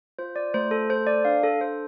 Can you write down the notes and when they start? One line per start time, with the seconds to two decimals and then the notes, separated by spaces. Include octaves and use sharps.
0.19 F4 C5
0.36 D5
0.54 A3 C5
0.71 A4
0.90 A4 C5
1.07 D5
1.25 D4 F5
1.43 A4
1.61 A4 C5